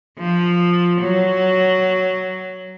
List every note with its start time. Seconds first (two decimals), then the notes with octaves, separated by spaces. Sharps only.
0.19 F3
1.00 F#3